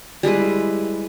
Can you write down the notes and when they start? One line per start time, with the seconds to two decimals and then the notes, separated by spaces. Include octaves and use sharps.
0.23 G3 G#3 E4 B4